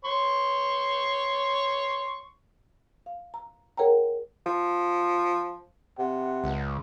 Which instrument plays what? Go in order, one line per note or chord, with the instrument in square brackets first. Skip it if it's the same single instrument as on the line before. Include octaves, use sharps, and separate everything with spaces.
[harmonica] C#5 C6 C#6
[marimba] F5
A#5
G#4 A#4 C#5 F#5 G5 A#5
[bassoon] F3
[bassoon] C3 [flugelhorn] F#5
[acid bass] C#2